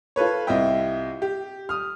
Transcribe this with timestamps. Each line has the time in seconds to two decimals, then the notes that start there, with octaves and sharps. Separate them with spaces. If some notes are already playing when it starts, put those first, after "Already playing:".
0.16 F4 A4 B4 C#5
0.47 C2 E4 F4 D#5 E5 G5
1.22 G4
1.69 D#6 F6